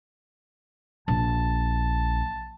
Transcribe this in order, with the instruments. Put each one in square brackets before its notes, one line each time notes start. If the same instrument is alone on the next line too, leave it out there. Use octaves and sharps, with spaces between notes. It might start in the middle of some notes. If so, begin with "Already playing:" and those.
[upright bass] A#1 [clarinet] A5